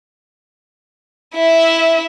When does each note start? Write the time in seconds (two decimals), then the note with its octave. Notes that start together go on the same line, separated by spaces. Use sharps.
1.35 E4 E5